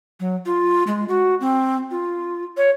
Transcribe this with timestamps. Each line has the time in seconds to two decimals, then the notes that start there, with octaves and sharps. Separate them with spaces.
0.20 F#3
0.46 F4
0.87 G#3
1.08 F#4
1.41 C4
1.91 F4
2.57 C#5